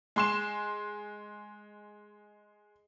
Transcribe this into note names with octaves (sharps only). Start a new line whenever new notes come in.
G#3 C6 E7